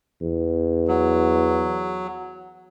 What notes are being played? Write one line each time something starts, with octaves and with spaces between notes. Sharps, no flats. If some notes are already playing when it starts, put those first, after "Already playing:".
E2
F#3